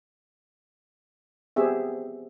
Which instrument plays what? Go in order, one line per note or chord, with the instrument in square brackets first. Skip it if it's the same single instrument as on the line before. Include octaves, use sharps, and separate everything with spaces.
[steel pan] B3 C4 G4 G#4 E5